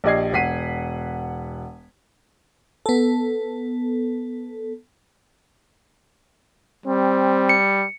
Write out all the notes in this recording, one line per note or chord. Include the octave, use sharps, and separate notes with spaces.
A#1 G4 D5 D#5 G#6 C7
E1 F#5 B6 C7 D#7
B3 A4
G3 C4
C#7